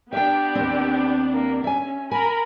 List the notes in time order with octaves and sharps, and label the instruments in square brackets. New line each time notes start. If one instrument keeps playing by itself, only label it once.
[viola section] B3 D4 [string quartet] G4 [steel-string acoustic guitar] E5 G5
[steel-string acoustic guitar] D#2 C4
[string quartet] A#3
[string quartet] C#4 [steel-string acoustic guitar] E5 G#5
[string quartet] A#4 [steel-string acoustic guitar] G#5 [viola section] A#5 B5